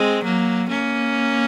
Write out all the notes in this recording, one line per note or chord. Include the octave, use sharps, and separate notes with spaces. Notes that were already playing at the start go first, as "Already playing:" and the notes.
Already playing: G#3 C4
F#3 A#3
A#3 C#4